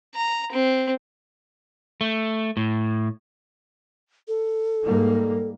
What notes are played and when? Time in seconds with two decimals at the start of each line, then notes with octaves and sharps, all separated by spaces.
0.14 A#5
0.52 C4
2.01 A3
2.57 A2
4.28 A4
4.83 G#2 G3 A#3